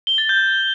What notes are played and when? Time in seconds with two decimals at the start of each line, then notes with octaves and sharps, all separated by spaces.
0.07 G7
0.18 A6
0.29 G6